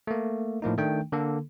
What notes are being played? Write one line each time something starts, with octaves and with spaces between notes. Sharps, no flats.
A3 A#3
A2 F3 A#3 D#4
D#3 A3 D4 G5
D3 A#3 A4